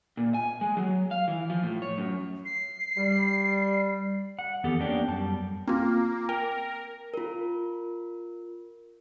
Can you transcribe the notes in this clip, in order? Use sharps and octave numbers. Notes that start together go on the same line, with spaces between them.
A#2
G#5
G#3
F#3
F5
E3
F3
A2
C#5
F#2
C7
G3
F#5
F2 E3 B3 G4 A4
A#3 B3 C#4 D4 G4
F#2 G3 A5
A#3 C4 F4
A#4 G5
F4 A#4